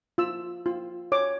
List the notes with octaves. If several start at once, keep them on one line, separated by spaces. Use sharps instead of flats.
F4 E6
F4
C#5 D6